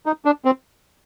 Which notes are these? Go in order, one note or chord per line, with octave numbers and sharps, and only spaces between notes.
D#4
D4
C4